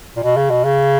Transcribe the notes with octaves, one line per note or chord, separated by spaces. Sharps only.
A#2
B2
C#3
B2
C#3